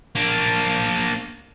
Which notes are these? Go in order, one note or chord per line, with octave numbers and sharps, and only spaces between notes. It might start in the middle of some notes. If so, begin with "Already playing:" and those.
A#3 D4